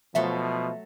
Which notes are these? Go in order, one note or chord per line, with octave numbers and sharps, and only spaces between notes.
B2 F3 F#3 A3 E5 C6